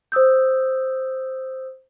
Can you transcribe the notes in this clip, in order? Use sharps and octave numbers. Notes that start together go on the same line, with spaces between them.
C5 D#6 E6 G6